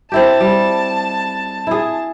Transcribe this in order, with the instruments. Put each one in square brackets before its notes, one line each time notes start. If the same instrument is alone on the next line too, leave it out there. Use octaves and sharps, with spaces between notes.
[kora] C4 E4 G4 [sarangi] A5
[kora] G3
E4 G#4